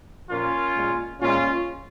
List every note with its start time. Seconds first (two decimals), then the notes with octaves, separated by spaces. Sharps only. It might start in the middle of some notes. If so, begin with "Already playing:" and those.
0.29 A#2 F3 A#3 C#4 F4
0.75 A#2 G#3
1.21 A#2 G#3 C#4 F4